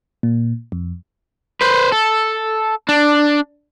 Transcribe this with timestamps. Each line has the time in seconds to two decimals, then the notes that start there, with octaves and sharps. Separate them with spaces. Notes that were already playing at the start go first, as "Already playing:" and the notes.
0.23 A#2
0.72 F2
1.61 B4 C5
1.92 A4
2.89 D4